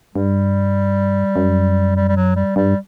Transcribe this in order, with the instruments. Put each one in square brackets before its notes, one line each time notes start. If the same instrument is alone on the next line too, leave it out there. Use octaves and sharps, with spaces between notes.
[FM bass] G2 [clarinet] G3
[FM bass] F#2
[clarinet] G3
G3
F#3
G3
[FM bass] G2 [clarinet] G3